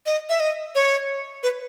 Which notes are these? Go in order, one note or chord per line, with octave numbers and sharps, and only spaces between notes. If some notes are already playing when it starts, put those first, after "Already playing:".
D#5
E5
D#5
C#5
B4